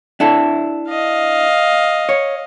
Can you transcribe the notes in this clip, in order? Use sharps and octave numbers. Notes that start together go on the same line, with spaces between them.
D4 E4 A4
D#5 F5
C#5